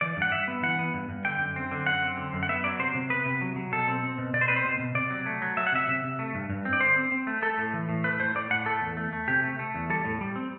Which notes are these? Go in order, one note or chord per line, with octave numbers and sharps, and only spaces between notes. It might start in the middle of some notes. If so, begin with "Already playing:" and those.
E3 D5
G2 F#5
G2 E5
B3
E3 F#5
B3
G2
G2
D3 G5
F#2
C4
D3
F#2 F#5
C4
D3
F#2
F#5
B3 E5
F#3 D5
C3 C5
C3
B3 B4
C3
F#3
F#3
B2 A4
C4
C4
B2
B2 D5
C5
C4 B4
C5
B2
B2
C3 D5
F#3
A3
F#3
F#3 E5
F#5
C3 E5
C3
C3
A3
G2
G2
C4
D5
D3 C5
C4
C4
A3
A3 A4
A2
E3
A2
A3 B4
A2 C5
A2 D5
A2 F#5
A3 A4
E2
A3
A3
C3 G4
A3
A3
E2
G3 A4
A2
G3
C4